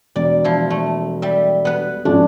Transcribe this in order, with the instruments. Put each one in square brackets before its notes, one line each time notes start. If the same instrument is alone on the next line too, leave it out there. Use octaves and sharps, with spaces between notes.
[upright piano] E1 [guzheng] D5
[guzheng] F3 E4
A3
G3 E5
B3 B4
[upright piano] G#1 F3 C#4 [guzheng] D4